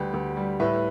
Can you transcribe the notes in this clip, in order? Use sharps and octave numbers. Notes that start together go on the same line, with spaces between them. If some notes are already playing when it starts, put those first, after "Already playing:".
Already playing: D2 G3 G4 B4
D2
G3
A2 B4 E5